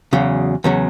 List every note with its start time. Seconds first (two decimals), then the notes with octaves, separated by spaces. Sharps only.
0.13 E2 C#3 F#3
0.64 E2 C#3 F#3